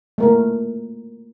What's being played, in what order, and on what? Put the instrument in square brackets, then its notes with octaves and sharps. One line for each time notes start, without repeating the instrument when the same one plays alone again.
[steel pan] A3 A#3 A#4